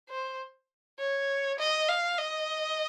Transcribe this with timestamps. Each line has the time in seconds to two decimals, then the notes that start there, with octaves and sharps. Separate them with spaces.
0.10 C5
0.99 C#5
1.59 D#5
1.89 F5
2.18 D#5